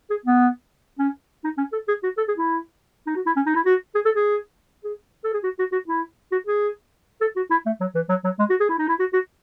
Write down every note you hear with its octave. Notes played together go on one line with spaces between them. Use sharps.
G#4
B3
C#4
D#4
C#4
A4
G#4
F#4
A4
G#4
E4
D#4
F#4
E4
C#4
D#4
E4
F#4
G#4
A4
G#4
G#4
A4
G#4
F#4
F#4
F#4
E4
F#4
G#4
A4
F#4
E4
A3
F#3
E3
F#3
F#3
G#3
F#4
G#4
E4
D#4
E4
F#4
F#4